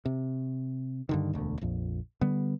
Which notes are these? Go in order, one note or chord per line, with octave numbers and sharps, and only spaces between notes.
C3
G2 D3 D#3
E1 D2
A#1 F2
D3 G3 B3